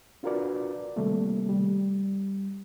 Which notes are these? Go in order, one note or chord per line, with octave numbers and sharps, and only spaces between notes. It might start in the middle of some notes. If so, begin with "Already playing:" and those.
D4 F4 F#4 A#4 B4 D5
C3 D#3 G3 A3 A#3
G3